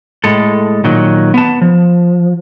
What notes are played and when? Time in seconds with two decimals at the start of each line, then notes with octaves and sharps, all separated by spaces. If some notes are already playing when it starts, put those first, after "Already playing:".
0.24 A2 G#3 A4
0.84 A#2 D#3 F#3
1.34 B3 A5
1.62 F3